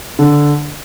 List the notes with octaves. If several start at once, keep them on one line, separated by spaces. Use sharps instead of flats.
D3